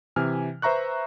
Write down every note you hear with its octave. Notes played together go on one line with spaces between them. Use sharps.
C3 E3 G#5 F6
B4 C5 E5 A#5 C#6 F#6